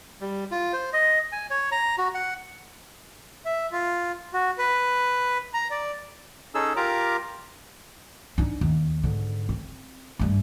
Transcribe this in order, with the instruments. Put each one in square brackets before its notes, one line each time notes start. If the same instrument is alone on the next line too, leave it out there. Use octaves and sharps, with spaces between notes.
[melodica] G3
F4
C5
D#5
G#5
C#5
A#5
F#4
F#5
[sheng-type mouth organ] E5
F4
F#4
B4
A#5
D5
[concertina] C#4 D#4 G#4 A4 E6
F4 G4 A#4 A#5 D6
[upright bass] D4 D#4
D#2
G#2 D3
C4
G2 A3